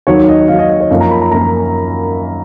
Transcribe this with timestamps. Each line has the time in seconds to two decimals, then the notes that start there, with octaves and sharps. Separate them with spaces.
0.07 D#2 D#3 F#3 C#5
0.28 D#5
0.48 D#2 D#3 F#3 F5
0.59 D#5
0.70 D#5
0.80 C#5
0.91 F#2 F3 A#3 F5
1.01 A#5
1.11 B5
1.21 A#5
1.32 F#2 F3 A#3 A#5